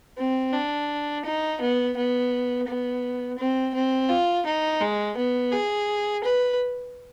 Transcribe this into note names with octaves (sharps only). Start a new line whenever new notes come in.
C4
D4
D#4
B3
B3
B3
C4
C4
F4
D#4
G#3
B3
G#4
B4